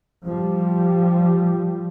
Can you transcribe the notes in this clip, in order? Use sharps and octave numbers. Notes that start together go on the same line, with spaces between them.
F3 G3